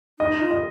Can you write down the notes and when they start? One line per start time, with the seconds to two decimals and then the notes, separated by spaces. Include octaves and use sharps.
0.19 D#4 D#5
0.41 F4
0.51 D#5